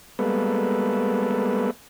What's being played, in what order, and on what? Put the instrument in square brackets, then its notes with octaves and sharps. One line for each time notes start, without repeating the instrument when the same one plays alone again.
[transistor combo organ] G3 G#3 A#3 B3 A4 B4